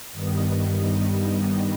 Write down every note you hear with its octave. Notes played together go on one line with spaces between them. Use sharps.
G2 D#3 G3 B3 D#4